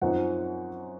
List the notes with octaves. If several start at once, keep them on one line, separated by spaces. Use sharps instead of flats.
F#2 F3 C4 D#4 F#5